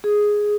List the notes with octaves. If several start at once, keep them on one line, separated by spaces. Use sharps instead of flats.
G#4